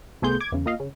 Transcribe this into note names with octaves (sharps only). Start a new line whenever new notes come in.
C2 A3 B3 G#4 C6 G6
D6 G#6
E2 C#3
A#3 F4 D#5 F5
C#3